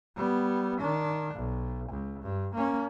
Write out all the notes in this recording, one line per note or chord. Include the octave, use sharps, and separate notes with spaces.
G3 B3
D#3 D4
B1
C#2
G2
A#3 C#4